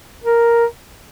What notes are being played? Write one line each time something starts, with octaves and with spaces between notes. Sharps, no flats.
A#4